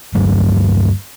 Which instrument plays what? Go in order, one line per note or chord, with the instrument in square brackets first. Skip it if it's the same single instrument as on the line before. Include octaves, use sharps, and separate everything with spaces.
[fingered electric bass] D2 G2 F#3 A3